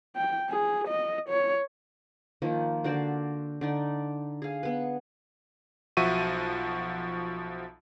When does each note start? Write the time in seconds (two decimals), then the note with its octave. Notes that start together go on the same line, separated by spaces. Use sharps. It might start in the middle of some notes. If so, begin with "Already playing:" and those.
0.16 G5
0.50 G#4
0.88 D#5
1.29 C#5
2.42 D#3 F3 A#3
2.84 D3 F#4 C5 D5
3.61 D3 D#4 D5
4.42 G#4 F5
4.63 B3 B4
5.97 B1 F3 F#4 E5 C#6 D#7